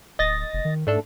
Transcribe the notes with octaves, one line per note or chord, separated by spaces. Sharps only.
D1 D#5 A6 A#6
F1
D#3
G#2 A3 D4 A4